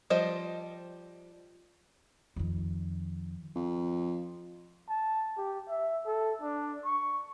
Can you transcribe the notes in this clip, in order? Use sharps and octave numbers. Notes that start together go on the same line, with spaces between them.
F3 G3 C5 D#5
F2 D#3
F2
A5
G4
E5
A4
D4
C#6